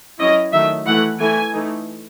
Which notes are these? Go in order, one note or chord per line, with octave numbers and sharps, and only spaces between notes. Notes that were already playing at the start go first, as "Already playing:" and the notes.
F#3 C#4 E4 D#5
D#3 F#3 A3 E5
E3 A3 E4 F#5
E3 A3 E4 G#5
E3 A3 D#4